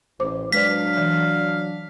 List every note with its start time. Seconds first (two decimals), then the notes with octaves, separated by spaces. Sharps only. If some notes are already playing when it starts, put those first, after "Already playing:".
0.20 A1 C5 D6
0.52 F#3 G#3 D4 B4 D5 F5 B6
0.97 E3 D5